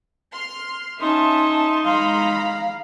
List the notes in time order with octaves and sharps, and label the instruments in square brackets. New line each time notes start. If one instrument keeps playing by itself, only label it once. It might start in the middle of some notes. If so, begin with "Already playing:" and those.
[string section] C6 F6
[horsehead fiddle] C#4 [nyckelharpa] D#4 [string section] E5 A5 [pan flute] C6
[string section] G#3 A#5 B5 [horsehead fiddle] F5